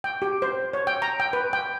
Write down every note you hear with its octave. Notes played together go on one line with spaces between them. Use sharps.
G5
G4
C5
C#5
G5
A#5
G5
B4
G5